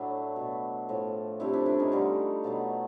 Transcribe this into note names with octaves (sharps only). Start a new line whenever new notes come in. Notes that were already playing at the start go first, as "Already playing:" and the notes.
Already playing: A2 F#3 A3 D4 E4
B2 F#3 A3
A2 F3 A3
C3 F3 A3 D4 E4
D4 E4
D4 E4
C#4 D#4
D3 G3 D#4 F4
B2 F#3 A3 D#4 F4